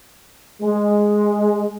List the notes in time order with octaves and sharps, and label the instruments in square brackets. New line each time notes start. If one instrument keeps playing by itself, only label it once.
[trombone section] G#3